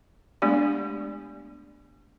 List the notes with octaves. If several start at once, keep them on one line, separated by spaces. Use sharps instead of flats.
G#3 A3 B3 D4 G4 D5